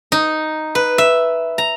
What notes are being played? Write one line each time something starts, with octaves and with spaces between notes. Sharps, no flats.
D#4
B4
E5
A#5